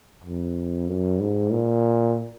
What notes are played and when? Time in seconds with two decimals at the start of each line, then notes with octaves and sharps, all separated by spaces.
0.24 F2
0.88 F#2
1.20 G#2
1.52 A#2